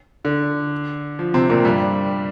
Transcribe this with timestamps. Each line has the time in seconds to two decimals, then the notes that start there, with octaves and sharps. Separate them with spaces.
0.25 D3
1.19 F3
1.34 C3 C4
1.49 A#2 A#3
1.65 G2 G3